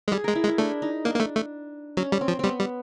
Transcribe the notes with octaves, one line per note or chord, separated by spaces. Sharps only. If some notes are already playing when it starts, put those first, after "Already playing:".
G#3
G3 G#4
G#3 A#4
E4
G#3
E4
A3 D4
D#4
A#3 D4
A#3
A3
A3
F#3 C#4
G3
C4
F3
G3 B3 C4
G3